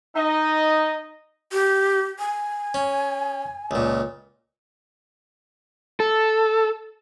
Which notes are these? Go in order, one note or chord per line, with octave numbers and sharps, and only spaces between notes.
D#4 D#5
G4
G#5
C#4
C#2 A#2
A4